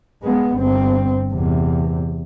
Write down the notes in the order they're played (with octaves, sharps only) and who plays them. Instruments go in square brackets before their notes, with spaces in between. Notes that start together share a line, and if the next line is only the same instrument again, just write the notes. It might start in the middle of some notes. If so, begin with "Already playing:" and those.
[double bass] G#3 B3
G1 C4
E2 C3